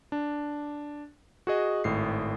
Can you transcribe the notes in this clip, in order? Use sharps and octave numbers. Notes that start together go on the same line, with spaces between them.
D4
F#4 G#4 D#5
G#1 A2 C7